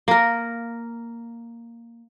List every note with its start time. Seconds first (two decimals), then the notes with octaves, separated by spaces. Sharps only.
0.08 A#3 A#4